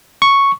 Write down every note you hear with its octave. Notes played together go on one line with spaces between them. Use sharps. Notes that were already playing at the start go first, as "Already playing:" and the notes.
C#6